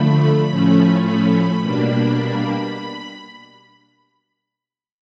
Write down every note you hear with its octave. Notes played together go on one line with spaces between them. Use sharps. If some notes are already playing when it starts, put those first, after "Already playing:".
Already playing: D3 F3 A3 B5
A2 F3 A3 C#4
B5
B2 G3 A#3 D4